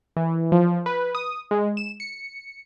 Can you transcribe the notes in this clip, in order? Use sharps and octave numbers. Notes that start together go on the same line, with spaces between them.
E3
F3
B4
D#6
G#3
E7
C#7